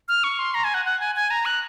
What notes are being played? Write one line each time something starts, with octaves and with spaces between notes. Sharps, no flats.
F6
C#6
C6
A#5
G#5
F#5
F#5
G#5
G#5
A#5
F#6